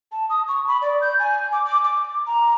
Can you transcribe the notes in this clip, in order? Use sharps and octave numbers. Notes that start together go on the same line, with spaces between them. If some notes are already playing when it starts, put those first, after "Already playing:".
A5
D#6
C#6
B5
D5
G6
G#5
D6
D6
D6
A#5